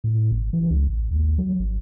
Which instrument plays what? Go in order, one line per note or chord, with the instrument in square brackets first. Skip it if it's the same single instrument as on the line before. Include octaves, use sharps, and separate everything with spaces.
[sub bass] A2
G#1
E3
C#2
A1
D#2
F#3
G#1